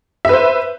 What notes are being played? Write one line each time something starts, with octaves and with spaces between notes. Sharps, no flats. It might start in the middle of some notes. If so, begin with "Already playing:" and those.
B4 C5 E5